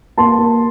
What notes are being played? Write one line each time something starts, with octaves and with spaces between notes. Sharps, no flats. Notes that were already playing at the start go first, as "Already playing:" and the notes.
A#3 A5 C6
A#3